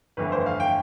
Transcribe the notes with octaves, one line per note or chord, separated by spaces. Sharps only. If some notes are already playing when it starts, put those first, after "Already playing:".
G1 F2 E3 A3 B4
C5
F5
G5